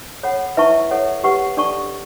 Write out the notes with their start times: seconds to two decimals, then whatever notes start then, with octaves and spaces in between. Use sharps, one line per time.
0.23 A4 C#5 F#5 B5
0.57 E4 B4 E5 A5 C#6
0.91 A4 C#5 F#5
1.24 G4 B4 F#5 C#6
1.57 D4 A4 D5 A5 C#6